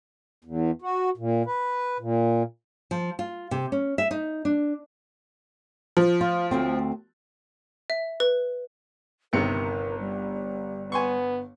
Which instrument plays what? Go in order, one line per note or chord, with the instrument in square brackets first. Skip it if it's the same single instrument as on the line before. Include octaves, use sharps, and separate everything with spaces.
[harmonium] E2
F#4
A#2
B4
A#2
[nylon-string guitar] F3
F4
C3
C#4
E5
D#4
D4
[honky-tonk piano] F3
[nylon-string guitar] F4
D2 A3 C4
[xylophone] E5
B4
[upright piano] G1 C#7 [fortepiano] C3 D#3 [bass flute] A#4
[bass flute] G3
[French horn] B3 [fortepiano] G#5 C6 C#6